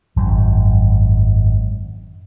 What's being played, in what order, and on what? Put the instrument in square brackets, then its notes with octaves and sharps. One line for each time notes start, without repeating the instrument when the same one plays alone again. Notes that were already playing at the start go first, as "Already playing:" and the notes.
[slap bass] G#1 F#2 F#3